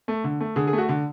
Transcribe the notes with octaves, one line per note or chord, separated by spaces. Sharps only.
A3
D3
A3
D3 G#4
G#4
A3
F#4
D3